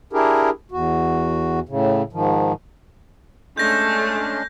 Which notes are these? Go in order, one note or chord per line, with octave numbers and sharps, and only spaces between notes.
D4 E4 G4 G#4 A#4
E2 F#4
A2 C#3
G#2 D#3 F3
G#3 A3 C#4 D4 G6 A#6